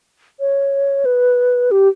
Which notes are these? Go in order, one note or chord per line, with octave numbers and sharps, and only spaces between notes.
C#5
B4
G4